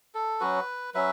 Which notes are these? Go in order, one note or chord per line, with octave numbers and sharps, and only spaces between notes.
A4
F#3 C#4 F#4 B4
F#3 C#4 B4 E5